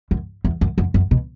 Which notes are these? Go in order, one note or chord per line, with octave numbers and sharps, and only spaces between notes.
F#2
E2
F#2
F#2
F#2
B2